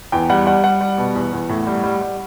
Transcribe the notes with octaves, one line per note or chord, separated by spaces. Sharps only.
E2 G5
G3 F#5
G3 F#5
G3 F#5
G3
B2
E2
E2
A2
G3
G3
G3